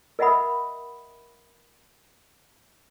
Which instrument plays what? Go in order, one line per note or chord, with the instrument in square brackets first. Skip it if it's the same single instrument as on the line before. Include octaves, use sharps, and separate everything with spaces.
[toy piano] A#4 D#5 E5 F#5 B5 D#6